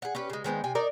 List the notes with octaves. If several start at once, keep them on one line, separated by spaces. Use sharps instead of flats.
G#4 F#5
C#4 G4 B4
C#3 G#3
D#3 G#3 B3 C4
C3 G5 G#5
D#4 A#4 D5